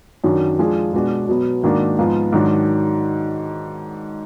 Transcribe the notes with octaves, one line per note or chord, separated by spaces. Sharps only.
F#2 D#3 F#3 D4 F#4
F3 G#3 D4 F4 G#4
B2 G#3 D4 F#4
B2 F#3 B3
G#2 D#3 A#3 D4 F#4
G#2 F3 B3 F4
G#2 D#3 F#3 D4 F#4